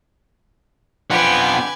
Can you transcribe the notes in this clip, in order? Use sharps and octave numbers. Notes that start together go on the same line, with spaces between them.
B1 D3 C4 F4 G4 B4 F#5 G#5